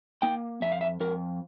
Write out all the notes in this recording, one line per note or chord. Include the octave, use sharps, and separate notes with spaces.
A#3 G5
F2 E5
F5
E5
F2 A#4